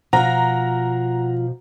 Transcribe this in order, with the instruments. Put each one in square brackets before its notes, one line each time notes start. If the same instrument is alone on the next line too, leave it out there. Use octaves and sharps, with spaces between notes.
[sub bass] B2 [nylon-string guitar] F3 [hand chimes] F#5 [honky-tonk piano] A#5